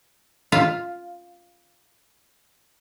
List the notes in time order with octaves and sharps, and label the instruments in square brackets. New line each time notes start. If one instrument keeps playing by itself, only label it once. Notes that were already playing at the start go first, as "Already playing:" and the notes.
[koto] F4 F5